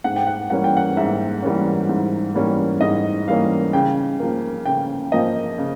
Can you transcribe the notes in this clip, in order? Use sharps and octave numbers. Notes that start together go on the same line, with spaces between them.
G#2 F#5
G5
F#5
E3 G3 A#3 C#4 F#5
G5
F#5
G#2 E5
E3 G3 A#3 C#4
G#2
E3 G3 A#3 C#4
G#2 D#5
E3 G3 A#3 C#4 F5
C#3 G5
F3 A#3
C#3 G5
F3 A#3 D#5
C#3